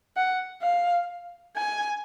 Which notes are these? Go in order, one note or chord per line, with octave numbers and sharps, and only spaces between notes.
F#5
F5
G#5